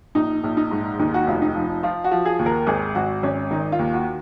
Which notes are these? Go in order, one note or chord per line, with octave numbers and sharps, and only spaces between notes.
A#1 D#4
A#1
D#4
G#2
D#2 D#4
F#4
F1 F4
D#4
F3
F3 F4
F#4
F3
G#4
D#2
A#4
G#1 G#4
G#1 F#4
G#1 C#4
D#3 D#4
F4
D#2
F#4